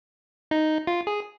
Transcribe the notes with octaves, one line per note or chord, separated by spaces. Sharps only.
D#4
F4
G#4